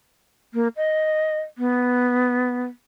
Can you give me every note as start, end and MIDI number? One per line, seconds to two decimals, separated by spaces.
0.54 0.68 58
0.77 1.38 75
1.58 2.63 59